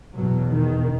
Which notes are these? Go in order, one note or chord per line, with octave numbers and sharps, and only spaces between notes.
E2 B2 F#3
D#3